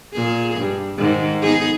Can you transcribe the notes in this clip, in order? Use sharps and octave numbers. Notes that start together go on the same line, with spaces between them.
A#2 G#4
G2
G#2 D#3
B3 D#4 G#4